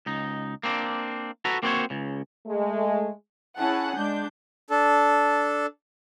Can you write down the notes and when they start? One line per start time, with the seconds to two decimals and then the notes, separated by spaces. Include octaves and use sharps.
0.06 C#2 D#4
0.63 A#3 C4 D4
1.45 F#4 A4 B4 A#5
1.63 A#3 C4 F#4 G#4 C5 C#5
1.90 C#2 C#3
2.47 G#3 A3
3.58 C#4 E4 G#4 F#5 A5
3.96 G#3 D4 G6
4.70 D4 A4